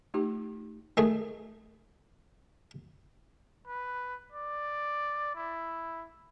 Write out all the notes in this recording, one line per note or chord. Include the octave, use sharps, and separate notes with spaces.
A3 D#4 F4 G4
D#3 A3 G#4
B4
D5
E4